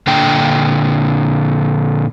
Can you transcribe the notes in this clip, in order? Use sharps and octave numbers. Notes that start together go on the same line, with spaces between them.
A#2 D3 D4 G5